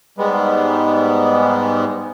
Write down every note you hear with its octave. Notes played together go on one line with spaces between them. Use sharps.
G#2 G3 G#3 B3